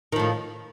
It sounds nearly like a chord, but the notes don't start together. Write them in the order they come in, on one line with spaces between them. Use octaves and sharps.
D#3 F3 A2